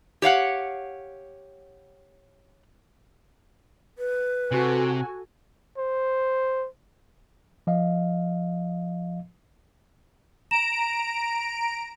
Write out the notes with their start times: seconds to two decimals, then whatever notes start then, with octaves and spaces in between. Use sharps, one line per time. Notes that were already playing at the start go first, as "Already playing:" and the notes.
0.22 G4 C#5 F5 F#5
3.99 B4
4.51 C3 F#4 A4 G#5
5.78 C5
7.67 F3 D#5 F5
10.51 A#5 D7 E7